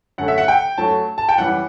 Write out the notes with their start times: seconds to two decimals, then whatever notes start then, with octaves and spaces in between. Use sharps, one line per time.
0.18 F#2 D3 A3 F#5
0.28 E5
0.38 F#5
0.48 G5
0.78 F#2 F#3 A3 A5
1.18 A5
1.29 G5
1.38 F#2 E3 G3 F#5